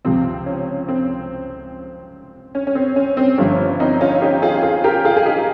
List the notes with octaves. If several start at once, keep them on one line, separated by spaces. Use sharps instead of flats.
C#2 C3 F3 C4
C#4
C4
C#4
C#4
C4
C#4
C4
G1 G2 F3 C#4
C4 D#4
C#4 F4
D#4 G4
F4 G#4
F4 G#4
G4 A#4
F4 G#4
G#4
D#4 G4